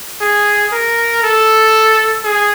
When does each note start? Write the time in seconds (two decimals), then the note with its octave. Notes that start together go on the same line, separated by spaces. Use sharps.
0.21 G#4
0.72 A#4
1.23 A4
2.24 G#4